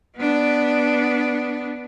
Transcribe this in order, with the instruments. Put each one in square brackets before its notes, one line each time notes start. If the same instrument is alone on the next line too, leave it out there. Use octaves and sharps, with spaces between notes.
[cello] B3 D4